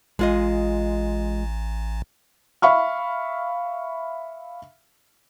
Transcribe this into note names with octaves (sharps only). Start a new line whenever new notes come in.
A1 G#3 F4 D#5
E5 F5 B5 C#6 F6